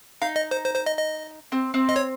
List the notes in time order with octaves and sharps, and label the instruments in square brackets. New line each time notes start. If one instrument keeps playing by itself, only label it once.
[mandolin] D#4 [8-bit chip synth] F5
[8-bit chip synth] D#5
C5
C5
C5
D#5
D#5
[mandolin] C4
C4
[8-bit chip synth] D#5
C#5